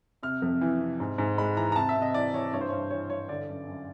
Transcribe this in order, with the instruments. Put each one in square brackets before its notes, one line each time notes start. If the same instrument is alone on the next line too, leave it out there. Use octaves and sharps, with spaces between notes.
[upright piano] C3 F6
F2
E3
C3
G#2
G#2
G#3 B5
E3 A#5
A#5
C3 A5
E5
C3
D#5
E3 D5
E3 C#5
G2 C#5
C5
G2 C#5
E3 C#5
G2 C#5
D3 D5
F#2
F#2